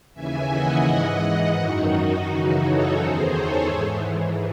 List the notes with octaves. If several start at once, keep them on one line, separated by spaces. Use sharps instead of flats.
D#2 C#3 E3 E5 G#5
D#5 F#5
G#2 E3
F#2 D#3 D#4 F#4
D#4 F#4
F#2 C#3 E3
A4 C#5
E2 D#3 G#4 C5
A4 C#5
G#2 E3